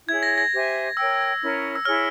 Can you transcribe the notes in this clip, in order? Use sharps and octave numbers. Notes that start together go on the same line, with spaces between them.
E4 G#4 C#5 G#6
A#6
A#6
G4 C5 E5 G#5
A#4 C#5 G5 E6
C#4 E4 A#4 C#5
E6
E4 G#4 C#5 F6